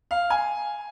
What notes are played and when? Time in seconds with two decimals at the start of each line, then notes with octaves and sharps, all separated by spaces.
0.11 F5
0.30 G#5